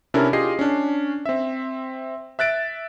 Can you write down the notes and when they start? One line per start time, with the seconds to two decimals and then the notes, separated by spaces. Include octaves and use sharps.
0.14 C3 C#4 D4 E4 A4 A#4
0.33 F4 G4 G#4 D#5 C7
0.59 C#4 D4
1.26 C4 E5
2.39 E5 F#6 A6 D7